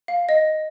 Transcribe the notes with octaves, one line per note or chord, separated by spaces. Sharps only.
F5
D#5